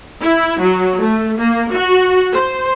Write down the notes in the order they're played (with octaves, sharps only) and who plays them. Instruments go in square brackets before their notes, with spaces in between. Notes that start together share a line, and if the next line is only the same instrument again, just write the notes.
[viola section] E4
F#3
A3
A#3
F#4
C5